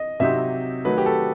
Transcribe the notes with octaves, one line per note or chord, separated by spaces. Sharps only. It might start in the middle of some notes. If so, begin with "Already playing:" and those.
Already playing: D#5
C3 F#3 C4 D#4 G4 E5
D#3 F#3 A3 D#4 F#4 B4
G4
A4